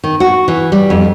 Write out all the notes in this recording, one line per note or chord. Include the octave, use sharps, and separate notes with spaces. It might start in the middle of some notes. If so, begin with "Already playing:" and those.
D#3
F#4
E3
G3
F2